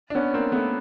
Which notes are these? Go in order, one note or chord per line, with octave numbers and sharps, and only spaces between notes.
D4
B3 C#4
A#3 C4
A3 B3